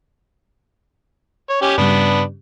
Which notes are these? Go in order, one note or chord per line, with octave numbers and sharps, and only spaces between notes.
C#5
C#4 G4
G2 C#3 G3 B3 D4